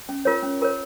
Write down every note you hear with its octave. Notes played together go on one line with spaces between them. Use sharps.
C#4
F4 A#4 C#5
C#4
F4 A#4 C#5